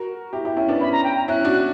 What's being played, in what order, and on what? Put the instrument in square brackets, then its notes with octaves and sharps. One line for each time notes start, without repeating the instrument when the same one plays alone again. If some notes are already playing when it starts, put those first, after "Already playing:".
Already playing: [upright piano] F#4 A#4
E4 G4
E4 G4
C#4 E4
B3 D4
[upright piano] C#4 E4 [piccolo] B5
[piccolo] A#5
G5
A#5
[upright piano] C#4 E4 [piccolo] F#6
[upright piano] D4 F#4